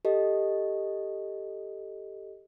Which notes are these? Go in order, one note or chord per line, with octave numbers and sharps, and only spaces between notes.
G4 A4 D#5